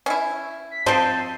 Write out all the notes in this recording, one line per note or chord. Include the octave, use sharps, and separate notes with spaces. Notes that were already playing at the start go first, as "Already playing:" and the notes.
C#4 E4
B6
F3 C4 D#4 C5 A5